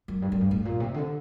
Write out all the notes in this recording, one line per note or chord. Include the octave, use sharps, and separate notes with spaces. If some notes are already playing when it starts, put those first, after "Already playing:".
F#2
G2
F#2
G2
A2
A#2
C3
D3